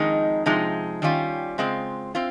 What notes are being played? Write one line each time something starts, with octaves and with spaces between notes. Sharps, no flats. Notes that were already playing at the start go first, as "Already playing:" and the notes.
Already playing: F2 D#3 G#3 D#4
C3 F3 G#3 D#4
D#3 G3 C#4 F4
C#3 G#3 C4 F4
C4 F4